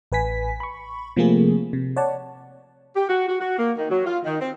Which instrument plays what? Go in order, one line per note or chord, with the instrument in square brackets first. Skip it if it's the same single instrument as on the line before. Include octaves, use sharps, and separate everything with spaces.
[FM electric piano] A1 B4 G#5 B6
B5 C#6
C3 F3 A3 A#3 C4 G#4
C3
C#5 D5 F#5 A5
[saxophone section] G4
F#4
F#4
F#4
A#3
D#3
F#3
F4
D#3
C4